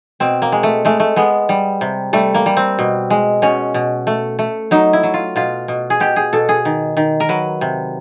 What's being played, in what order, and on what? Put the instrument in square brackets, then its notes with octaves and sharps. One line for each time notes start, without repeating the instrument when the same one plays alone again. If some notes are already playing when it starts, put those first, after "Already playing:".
[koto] B2 C4
A#3
G#3
A3
G#3 A3
A3
G#3 B3
G3
C3
G3 A3
A#3
G3
C4
B2
G#3
B2 C#4
B2
A3
A3
F#3 D#4
E4
F#3
F4
B2 F4
B2
G#4
B2 G4
G#4
B2 A4
G#4
D#3
D#3
A#4
F#3 B4
C3